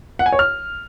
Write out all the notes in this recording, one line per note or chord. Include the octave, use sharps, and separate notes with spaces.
F#5
G#5
C#5
F6